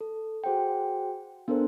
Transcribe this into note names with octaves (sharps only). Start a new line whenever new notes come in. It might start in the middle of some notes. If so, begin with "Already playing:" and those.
A4
F#4 G#4 C5 F#5 G5
B3 D4 A4 A#4 C5